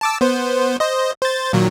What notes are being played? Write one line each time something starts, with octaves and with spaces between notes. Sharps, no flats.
A5 D6 E6
B3 C5
C5 D#5
C5 A6
A#2 D#3 F#3